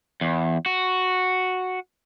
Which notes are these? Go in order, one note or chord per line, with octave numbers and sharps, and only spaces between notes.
E2
F#4